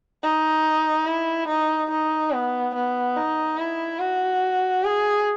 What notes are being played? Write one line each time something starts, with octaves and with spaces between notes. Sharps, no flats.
D#4
E4
D#4
D#4
B3
B3
D#4
E4
F#4
G#4